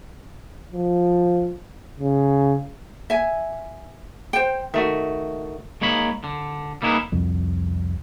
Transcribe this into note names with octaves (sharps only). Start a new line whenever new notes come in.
F3
C#3
E5 G#5
C5 G5
D#3 A3 F#4 E5
G#3 A#3 D#4 C#5 B5
D3
G3 A#3 D#4 E4 G#4 B4
C2 F2